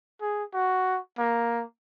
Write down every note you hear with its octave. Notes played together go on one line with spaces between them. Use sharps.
G#4
F#4
A#3